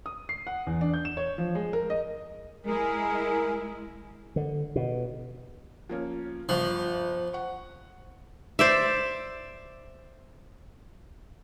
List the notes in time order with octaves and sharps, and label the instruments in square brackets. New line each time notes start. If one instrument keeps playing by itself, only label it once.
[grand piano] D#6
C7
F#5
E2
D4
G6
E7
C#5
F3
G#3
A#4
D#5
[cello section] G#3 E4 [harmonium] G#4 A#4
[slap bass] D3
B2
[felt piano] F3 A#3 C#4
[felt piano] G1 C#6 [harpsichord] F3
[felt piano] F#5 C#6
[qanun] C5 D5 E5